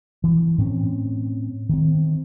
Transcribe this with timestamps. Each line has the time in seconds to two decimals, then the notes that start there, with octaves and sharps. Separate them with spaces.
0.24 E3
0.58 A2 C4 C#4
1.69 D#3 C4